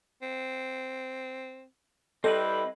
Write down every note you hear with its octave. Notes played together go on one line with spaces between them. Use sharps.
C4
G3 C4 E4 A4 B4 D#5